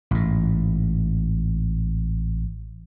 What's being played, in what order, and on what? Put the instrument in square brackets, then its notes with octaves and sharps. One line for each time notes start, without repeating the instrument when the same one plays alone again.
[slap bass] A1 G#2